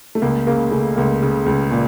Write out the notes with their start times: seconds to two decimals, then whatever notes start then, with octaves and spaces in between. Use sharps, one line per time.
0.15 A3
0.22 C#2 A#3
0.47 C#3 A#3
0.71 C#3 A3
0.96 C#2 A#3
1.22 C#3
1.46 C#2
1.71 A#2